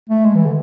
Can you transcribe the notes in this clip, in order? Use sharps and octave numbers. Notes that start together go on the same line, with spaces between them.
A3
G#3
E3
D3